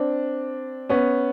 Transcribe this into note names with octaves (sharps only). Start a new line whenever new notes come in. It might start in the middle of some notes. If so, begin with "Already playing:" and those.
Already playing: C4 D4
B3 C#4